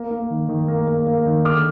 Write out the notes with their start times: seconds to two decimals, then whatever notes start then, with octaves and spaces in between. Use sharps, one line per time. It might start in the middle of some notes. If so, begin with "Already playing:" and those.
Already playing: A#3
0.11 A#3
0.30 D#3
0.49 D#3
0.68 A#3
0.88 A#3
1.07 A#3
1.26 D#3
1.45 D3 D6 F6